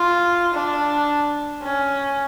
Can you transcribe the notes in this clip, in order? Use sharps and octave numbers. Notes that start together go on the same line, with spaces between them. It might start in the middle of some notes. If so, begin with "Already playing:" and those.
Already playing: F4
D4
C#4